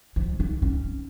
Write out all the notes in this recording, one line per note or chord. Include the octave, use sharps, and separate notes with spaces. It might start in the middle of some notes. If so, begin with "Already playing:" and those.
F3
D#4
C#4